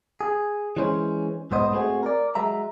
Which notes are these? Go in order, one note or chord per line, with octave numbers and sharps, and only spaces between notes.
G#4
E3 G#3 C#4 C5
B1 G#2 B3 C5 D#5
A3 C4 F#4 G#4
A#4 D5
F#3 G#3 E5 A#5